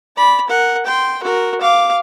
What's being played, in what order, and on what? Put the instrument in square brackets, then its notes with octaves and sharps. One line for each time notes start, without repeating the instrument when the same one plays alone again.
[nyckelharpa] D5 B5
A#4 F#5
G5 C6
F#4 A#4
F5 D6